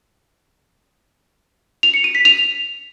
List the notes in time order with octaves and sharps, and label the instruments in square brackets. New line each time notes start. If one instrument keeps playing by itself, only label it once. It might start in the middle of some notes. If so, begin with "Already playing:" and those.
[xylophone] F7
C#7
D#7
B6
F7